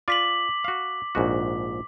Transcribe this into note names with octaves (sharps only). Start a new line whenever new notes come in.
F4 D5 D6 B6 F#7
F#4 F5
A#1 G#2 F#4